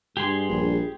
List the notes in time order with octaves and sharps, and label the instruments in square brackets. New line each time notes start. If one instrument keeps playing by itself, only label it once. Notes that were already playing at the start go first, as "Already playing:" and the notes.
[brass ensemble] G2 [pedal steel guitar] G4 G#4 C6
[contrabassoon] A#1